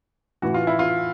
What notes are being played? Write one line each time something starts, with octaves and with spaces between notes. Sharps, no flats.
A2 E3 F#4
F4
E4
F4